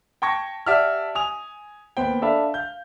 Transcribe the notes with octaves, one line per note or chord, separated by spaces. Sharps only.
G5 A5 C#6 G#6 A#6
G4 D5 E5 F#5 A5 F6
G#5 D#6 F7
D#2 B3 C5 G5
D4 A4 E5 F5 B5
F5 G6